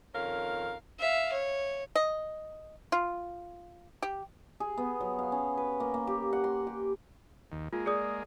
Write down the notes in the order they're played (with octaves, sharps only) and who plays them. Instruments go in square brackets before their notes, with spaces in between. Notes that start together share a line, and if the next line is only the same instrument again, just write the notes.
[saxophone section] F2 D#3 C#4 A#4 F5
[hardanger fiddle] E5 F5
C#5
[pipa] D#5
F4
G4
[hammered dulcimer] G#4
B3
F#3
F5
C#4
B4
A#3
A#3
G4
F#5
C6
G4
[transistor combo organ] D#2
[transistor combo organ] G#3 A#3 [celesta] F4
[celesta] G#4 D5 D#6